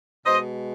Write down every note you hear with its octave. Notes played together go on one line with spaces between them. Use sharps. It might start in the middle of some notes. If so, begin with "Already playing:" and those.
B2 G#3 C5 D#5